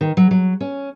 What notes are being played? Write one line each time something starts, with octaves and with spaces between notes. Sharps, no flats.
D#3
F#3
F#3
C#4